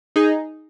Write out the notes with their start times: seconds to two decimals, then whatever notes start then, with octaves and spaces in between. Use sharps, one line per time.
0.16 D#4 G#4